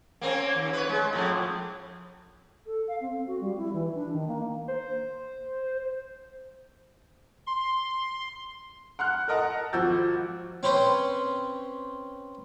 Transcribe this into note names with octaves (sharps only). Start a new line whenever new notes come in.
A#3 C4 C#4
D#2
B4 C#5
G#3
F2 A2
A4
F5
C4
F#4
G3
E4
E3
D4
D#3
A#3
C5
C6
F#5 C6 F6 F#6
A4 A#4 D#5 F#5 A5 A#5
G#1 F3 F#4 E6 G6 A6
C4 C#4 B4 C5